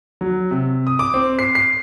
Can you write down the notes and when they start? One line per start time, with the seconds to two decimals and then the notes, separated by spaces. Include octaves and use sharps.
0.21 F#3
0.51 C3
0.87 D#6
0.99 D6
1.14 C4
1.39 C7
1.55 C7